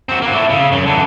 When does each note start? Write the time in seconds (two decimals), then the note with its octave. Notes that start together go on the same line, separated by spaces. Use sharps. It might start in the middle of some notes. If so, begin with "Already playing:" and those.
0.09 C4 F#4
0.22 A#3 F#4
0.34 A3 E4
0.50 C#3
0.72 F#2
0.86 D3 E3